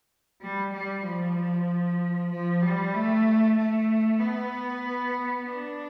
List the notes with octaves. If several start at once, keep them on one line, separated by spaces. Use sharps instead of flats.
G3
G3
F3
F3
G3
A3
A3
B3
D4